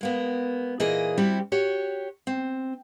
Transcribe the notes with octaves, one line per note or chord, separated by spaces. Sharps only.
G#3 A#3 B3
A#2 E3 A#3 G#4 D#5
G3 C4 E4 F#4 G4
F#4 G4 C#5
C4